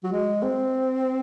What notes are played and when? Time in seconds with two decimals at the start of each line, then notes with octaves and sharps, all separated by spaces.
0.04 F#3
0.12 G#3
0.43 C4